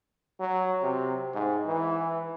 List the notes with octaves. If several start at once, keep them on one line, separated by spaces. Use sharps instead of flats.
F#3
C3
G#2
E3